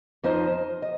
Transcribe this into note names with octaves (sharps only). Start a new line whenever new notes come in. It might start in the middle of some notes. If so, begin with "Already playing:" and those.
F2 F3 D#4 C5 D#5
D#5